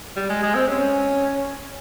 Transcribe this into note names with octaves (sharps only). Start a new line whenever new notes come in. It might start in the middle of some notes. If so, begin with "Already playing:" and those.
G3
G#3
G#3
C4
C#4